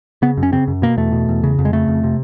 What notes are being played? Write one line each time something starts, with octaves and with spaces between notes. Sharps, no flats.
C#3 B3
F#2
C#4
C#3 C4
F#2
B2 A#3
E2 A3
B2
E2
C#3
F2
G#3
C#3 A3
F2
C3